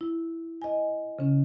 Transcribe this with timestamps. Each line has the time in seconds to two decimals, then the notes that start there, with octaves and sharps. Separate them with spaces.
0.01 E4
0.62 D#5 G#5
1.19 C#3 C#4